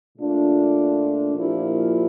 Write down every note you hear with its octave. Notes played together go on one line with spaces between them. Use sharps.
A#2 A3 D4 F4
A#2 F3 A#3 E4 G4